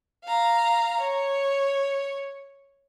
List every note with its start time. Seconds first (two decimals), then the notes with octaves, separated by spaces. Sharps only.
0.24 F5 A#5
1.00 C#5